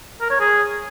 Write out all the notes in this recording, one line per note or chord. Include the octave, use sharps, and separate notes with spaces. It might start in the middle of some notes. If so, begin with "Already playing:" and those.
A#4
C#5
G#4